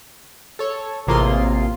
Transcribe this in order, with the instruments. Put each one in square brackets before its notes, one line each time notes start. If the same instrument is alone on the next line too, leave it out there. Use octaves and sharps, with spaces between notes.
[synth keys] A4 C#5
A1 C3 A#3 F4 G#4 C6